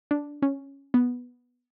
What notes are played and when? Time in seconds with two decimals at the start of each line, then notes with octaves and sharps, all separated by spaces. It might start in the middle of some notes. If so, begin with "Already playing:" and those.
0.11 D4
0.42 C#4
0.94 B3